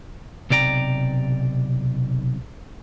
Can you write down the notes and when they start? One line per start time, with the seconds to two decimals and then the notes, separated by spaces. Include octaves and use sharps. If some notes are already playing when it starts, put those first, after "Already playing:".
0.50 B1 C3 D5 G5 A#5